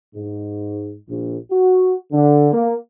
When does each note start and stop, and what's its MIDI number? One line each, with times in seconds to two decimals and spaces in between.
0.15 0.96 44
1.08 1.36 34
1.51 1.95 66
2.12 2.48 50
2.53 2.74 58